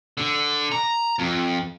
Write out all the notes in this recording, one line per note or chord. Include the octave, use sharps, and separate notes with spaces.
D3
A#5
F2